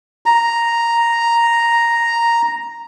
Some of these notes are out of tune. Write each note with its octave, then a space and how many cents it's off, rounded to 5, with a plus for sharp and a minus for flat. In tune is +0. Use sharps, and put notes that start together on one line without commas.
A#5 +0